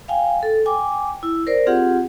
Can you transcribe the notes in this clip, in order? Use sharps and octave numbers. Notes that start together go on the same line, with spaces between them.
F5 G5 G#5
A4
G5 G#5 D6
E4
A#4 C5 D5
C4 F4 G4 G#4 F#5